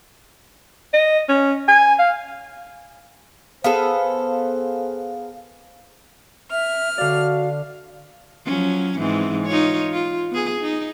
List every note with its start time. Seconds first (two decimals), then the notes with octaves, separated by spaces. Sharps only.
0.93 D#5
1.29 C#4
1.68 G#5
1.99 F5
3.64 B3 G#4 A4 C5 F5
6.51 E5 F6
6.98 D3 F#4 D5 F5
8.46 F3 F#3 C#4
8.98 G#2 E3 C4
9.47 D#4 F4 C#5
9.92 F4
10.31 B3 G#4
10.61 D#4